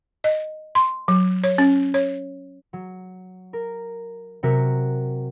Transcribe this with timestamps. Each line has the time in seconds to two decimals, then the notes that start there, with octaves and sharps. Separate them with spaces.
0.24 D#5
0.75 C6
1.08 F#3
1.44 C#5
1.58 C#4
1.94 C#5
2.73 F#3
3.53 A#4
4.43 C3 F#3 F#4 A#4 F#6 B6